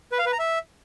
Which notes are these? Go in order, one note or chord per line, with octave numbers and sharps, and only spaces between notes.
B4
F5
B4
A#5
E5